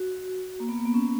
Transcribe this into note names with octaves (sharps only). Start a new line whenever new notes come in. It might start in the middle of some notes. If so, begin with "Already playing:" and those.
Already playing: F#4
A#3
B3
A#3
B3
C#4